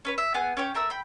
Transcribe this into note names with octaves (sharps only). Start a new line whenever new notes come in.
C#4 B4 C#5
E5
B3 G#4 G#5 F#6
C#4 G4 C#5 G6
A3 A#4 E5 E6
G5 B5